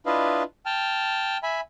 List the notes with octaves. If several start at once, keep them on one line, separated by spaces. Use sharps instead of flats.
D4 E4 F4 B4 D#5 F5
G5 A5 F6
E5 G#5 B5